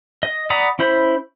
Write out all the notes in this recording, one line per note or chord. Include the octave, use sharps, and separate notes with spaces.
D#5
D5 F#5 A#5 B5 D#6
C#4 E4 C5 B5